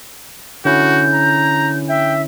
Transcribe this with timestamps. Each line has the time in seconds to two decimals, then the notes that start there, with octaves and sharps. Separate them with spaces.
0.65 D3 C#4 E4 F#4 G6
1.14 A#5
1.89 E5 G5